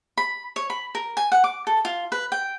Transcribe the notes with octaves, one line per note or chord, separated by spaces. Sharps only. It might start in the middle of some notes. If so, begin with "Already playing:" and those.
B5
C#5
B5
A#4
G#5
F#5
D6
A4
F4
B4
G5